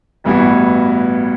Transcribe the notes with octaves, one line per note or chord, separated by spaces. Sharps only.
A1 G2 E3 B3 F#4